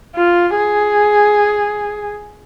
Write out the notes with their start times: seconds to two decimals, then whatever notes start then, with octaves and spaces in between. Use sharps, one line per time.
0.15 F4
0.57 G#4